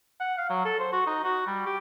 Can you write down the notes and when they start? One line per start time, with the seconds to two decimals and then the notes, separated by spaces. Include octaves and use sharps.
0.20 F#5
0.38 F5
0.50 F#3
0.65 A4
0.79 C5
0.92 F#4
1.07 D#4
1.24 F#4
1.47 G3
1.66 G4